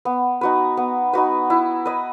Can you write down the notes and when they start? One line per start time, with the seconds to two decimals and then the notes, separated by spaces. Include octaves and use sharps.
0.05 B3
0.41 D#4 F#4 B4
0.77 B3
1.13 D#4 F#4 B4
1.50 E4
1.86 B4 D#5